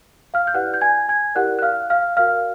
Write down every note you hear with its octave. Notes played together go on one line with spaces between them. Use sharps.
F5 F6
G6
E4 G4 B4 D5 F#5 F#6
G6
G#5 G#6
G#5 G#6
E4 G4 A#4 D5 F#5 F#6
F#6
F5 F6
F5 F6
F#4 A#4 D5 F5 F6